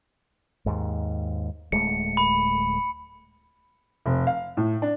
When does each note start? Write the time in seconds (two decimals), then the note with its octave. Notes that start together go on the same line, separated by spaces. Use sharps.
0.66 D#2 G#2
1.72 D1 G#3 A3 C#7
2.17 B5
4.06 F1
4.27 F5
4.57 A2
4.82 D4